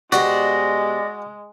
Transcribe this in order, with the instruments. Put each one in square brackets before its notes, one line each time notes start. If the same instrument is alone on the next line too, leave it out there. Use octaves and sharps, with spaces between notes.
[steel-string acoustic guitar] B2 G4 C5 [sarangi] G#3 [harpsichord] F#4 [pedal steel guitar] D5 D#5